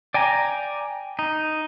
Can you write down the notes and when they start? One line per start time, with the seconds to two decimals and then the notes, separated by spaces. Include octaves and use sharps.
0.14 D5 G5 G#5 A#5
1.19 D#4